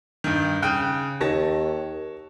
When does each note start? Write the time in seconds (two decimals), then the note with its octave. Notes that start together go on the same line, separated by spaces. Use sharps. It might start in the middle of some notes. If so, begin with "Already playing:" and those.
0.24 G2 D#3
0.62 C#3 G5 F#6
1.21 D#2 C#5 A5 A#6